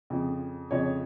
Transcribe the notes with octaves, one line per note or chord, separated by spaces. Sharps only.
F2 C#3 F3
F2 C#3 F3 C#5 D#5